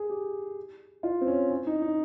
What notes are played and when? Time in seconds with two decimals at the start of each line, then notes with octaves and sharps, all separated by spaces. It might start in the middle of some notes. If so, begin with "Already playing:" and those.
Already playing: G#4
0.09 G4
1.03 F4
1.21 C4
1.27 C#4
1.50 C#4
1.67 D#4
1.82 D#4